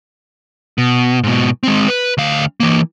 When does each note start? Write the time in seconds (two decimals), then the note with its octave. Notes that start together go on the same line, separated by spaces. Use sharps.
0.78 B2
1.23 G#2 B2
1.63 G#3 C4
1.88 B4
2.18 D2 F5
2.60 E3 A#3